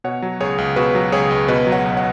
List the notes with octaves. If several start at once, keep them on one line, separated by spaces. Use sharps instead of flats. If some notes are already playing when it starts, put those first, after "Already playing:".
B2 C#5 F#5
F#3
C#2 G#4 C#5
C#2
B2 F#4 B4
F#3
C#2 G#4 C#5
C#2
B2 B4 D#5
F#3
C#5 F#5
B1
C#5 F#5